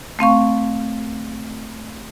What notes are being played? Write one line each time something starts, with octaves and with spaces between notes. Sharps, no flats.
A3 C4 F5 C#6